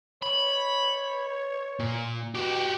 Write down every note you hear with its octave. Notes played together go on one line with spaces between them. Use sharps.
C#5 B5
A#2
B2 F#4 G4